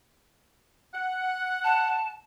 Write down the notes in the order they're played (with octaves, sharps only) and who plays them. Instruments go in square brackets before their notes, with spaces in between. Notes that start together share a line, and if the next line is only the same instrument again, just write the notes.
[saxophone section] F#5
[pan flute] A5